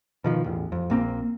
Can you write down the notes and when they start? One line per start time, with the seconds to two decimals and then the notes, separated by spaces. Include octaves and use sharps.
0.24 B2 D#3 F3
0.44 A1 E2
0.72 F2
0.90 A#1 A#3 C4